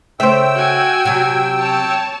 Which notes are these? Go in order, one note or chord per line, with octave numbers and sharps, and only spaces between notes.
C#3 A3 C#4 C5 E5 G5 E6
F#4 G#5
C3 F#3
C#5 A5